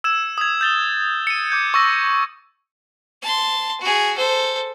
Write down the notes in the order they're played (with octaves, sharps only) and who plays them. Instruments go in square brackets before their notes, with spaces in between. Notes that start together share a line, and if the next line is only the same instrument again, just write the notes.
[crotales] E6 G#6 E7
D#6 G#6
G6 A6 G7
C#7 D#7
D6 G6 G#6
C#6 E6 A#6
[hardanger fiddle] A5 C6
F#4 G#4
A4 C5